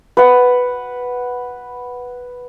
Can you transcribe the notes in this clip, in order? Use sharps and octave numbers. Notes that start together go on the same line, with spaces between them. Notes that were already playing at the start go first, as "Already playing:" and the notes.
B4 F#5